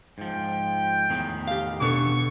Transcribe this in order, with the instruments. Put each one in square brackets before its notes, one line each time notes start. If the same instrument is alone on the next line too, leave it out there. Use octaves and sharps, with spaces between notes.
[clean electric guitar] G#2 F3 [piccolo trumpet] G5
[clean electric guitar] E2 A2 D#3
[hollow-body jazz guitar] G4 F5
[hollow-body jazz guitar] B2 D3 B3 [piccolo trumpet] C#6